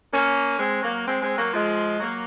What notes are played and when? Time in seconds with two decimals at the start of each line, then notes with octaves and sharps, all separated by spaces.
0.13 A#3 C#4
0.59 G#3 C4
0.82 F#3 A#3
1.06 G#3 C4
1.21 G#3 C4
1.38 F#3 A#3
1.54 F3 G#3
2.00 F#3 A#3